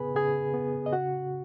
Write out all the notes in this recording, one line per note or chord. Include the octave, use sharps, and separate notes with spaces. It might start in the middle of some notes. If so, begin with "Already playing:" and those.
Already playing: C#3 B3 G#4 B4 G#5 B5
C#3 G#4 G#5
B3
D#5
C#3 F#4 F#5